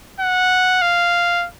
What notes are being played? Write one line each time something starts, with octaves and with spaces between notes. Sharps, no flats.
F#5
F5